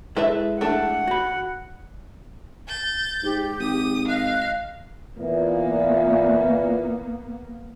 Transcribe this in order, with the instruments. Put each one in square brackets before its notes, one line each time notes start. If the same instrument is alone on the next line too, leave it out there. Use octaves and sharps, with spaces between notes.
[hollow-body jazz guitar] G#3 E4 [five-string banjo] A4 B4 E5
[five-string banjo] A3 D4 A4 [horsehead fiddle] F#5
[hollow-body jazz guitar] F#4 B5
[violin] G6 A6
[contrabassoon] G#2 [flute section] G4
[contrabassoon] G#1 [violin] D#6
[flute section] D#5 F#6 [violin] F5
[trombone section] A#2 E3 [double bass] A#3 B3